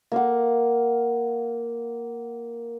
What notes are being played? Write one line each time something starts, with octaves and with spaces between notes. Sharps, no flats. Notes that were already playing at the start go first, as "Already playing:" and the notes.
A#3 F5 F#5